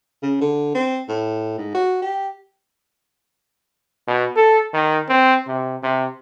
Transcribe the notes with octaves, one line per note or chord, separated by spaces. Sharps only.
C#3
D3
C4
A2
G#2
F#4
G4
B2
A4
D#3
C4
C3
C3